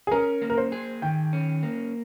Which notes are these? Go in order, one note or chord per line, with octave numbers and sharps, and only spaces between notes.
G#4
C#4 A#4
A#3
A#4
C5
G#4
D#3 G5
C#4
A#3